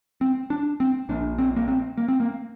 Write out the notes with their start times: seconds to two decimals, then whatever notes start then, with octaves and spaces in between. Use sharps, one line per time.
0.21 C4
0.50 D4
0.80 C4
1.09 A#1 A#2 D4
1.38 C4
1.56 A#3
1.68 C4
1.98 A#3
2.08 C4
2.20 A#3